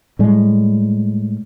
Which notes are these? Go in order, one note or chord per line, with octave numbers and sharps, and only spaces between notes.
A2 G3 G#3